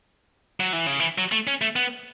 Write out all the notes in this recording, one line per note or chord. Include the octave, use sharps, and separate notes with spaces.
F#3
E3
C#3
E3
F#3
A3
C#4
A3
B3